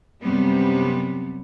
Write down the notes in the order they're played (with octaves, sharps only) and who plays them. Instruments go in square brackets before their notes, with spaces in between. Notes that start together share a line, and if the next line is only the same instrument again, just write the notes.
[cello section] F#2 C3 G3 B3